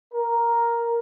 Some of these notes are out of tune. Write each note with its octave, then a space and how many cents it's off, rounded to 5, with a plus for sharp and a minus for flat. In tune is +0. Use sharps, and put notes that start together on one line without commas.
A#4 +5